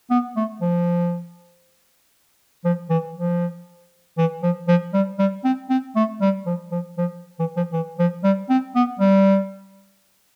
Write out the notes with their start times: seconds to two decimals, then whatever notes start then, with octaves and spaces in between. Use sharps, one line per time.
0.10 B3
0.36 A3
0.61 F3
2.64 F3
2.90 E3
3.15 F3
4.17 E3
4.42 F3
4.68 F3
4.93 G3
5.19 G3
5.44 C4
5.69 C4
5.95 A3
6.21 G3
6.46 F3
6.71 F3
6.97 F3
7.39 E3
7.57 F3
7.73 E3
7.99 F3
8.24 G3
8.49 C4
8.75 B3
8.99 G3